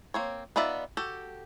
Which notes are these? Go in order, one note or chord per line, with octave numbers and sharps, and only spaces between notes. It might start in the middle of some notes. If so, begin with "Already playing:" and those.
A#3 C4 C#5
B3 D#4 F4 D5 E5
F#4 G4 A4